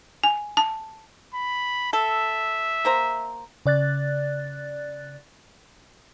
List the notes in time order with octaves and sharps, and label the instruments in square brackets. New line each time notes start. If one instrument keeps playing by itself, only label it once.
[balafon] G#5
A5
[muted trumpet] B5
[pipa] A4 [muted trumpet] E5
[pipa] A#3 C5 A#5
[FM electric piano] C#3 D5 F#6 A6